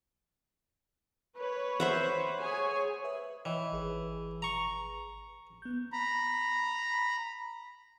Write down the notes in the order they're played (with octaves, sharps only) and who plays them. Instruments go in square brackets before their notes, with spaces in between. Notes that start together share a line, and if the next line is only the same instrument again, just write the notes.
[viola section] B4 C#5
[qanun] C5 E5 F#5
[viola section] G#4 C#5 G#5
[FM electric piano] B4 E5 D#6
[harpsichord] E3 [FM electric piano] C#5 D#5 G5
[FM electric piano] G#1 G#4 B4
[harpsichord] A#5 C#6
[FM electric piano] B3 G6
[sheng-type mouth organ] A#5 B5